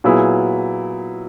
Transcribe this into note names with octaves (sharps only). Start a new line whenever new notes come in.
A#2 F#3 B3 E4 G#4